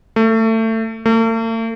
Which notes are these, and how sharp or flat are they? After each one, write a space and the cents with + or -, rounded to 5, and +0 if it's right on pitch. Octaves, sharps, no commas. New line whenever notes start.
A3 +25
A3 +45